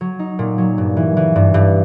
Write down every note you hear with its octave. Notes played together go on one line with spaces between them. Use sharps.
F#3
D#4
A#2
F#3
G2
E3
E3
G2
G2